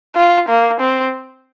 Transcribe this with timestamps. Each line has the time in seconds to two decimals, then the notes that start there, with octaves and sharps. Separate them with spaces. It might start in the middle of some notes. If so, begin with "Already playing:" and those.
0.16 F4
0.48 A#3
0.80 C4